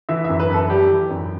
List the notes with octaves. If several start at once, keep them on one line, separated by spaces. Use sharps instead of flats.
E3 E5
E5
F#2
B4
F#2 A4
G3 G4
E3
F#2